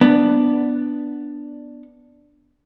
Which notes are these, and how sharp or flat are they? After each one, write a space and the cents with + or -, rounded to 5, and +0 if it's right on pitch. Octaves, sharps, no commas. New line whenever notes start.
B3 +0 D4 +0